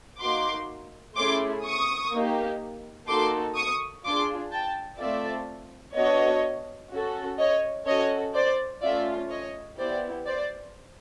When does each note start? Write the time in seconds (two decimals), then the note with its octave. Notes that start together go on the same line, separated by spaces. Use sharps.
0.21 A#3 D#4 F#4 C6 D6
1.17 A3 C#4 E4 G#4 C6 D6
1.65 C#6 D#6
2.12 A#3 D#4 G4
3.08 A#3 D#4 F#4 A4 C6 D6
3.56 C#6 D#6
4.04 D4 F4 G#4 C6 D6
4.51 G5 A5
4.99 A3 C4 F4 A4 D5 E5
5.95 B3 D4 F#4 A4 C#5 D#5
6.91 C#4 F#4 A4
7.39 C#5 D#5
7.87 C#4 F#4 A4 C#5 D#5
8.34 C5 D5
8.82 A3 C#4 F4 D5 E5
9.30 C#5 D#5
9.78 B3 E4 G4 C5 D5
10.26 C5 D5